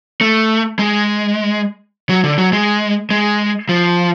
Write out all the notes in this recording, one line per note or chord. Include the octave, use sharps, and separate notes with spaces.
A3
G#3
F#3
D3
F#3
G#3
G#3
F3